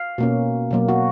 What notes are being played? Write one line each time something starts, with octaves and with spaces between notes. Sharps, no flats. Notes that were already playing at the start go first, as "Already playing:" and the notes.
Already playing: F5
B2 A#3 C#4
B2 F#3 A#3
F#4